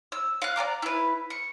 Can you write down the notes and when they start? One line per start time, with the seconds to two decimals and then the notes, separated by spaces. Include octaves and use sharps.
0.12 E6
0.42 F5 F#6
0.56 D5 G5 A#5 D6
0.82 E4 B4
1.30 C#6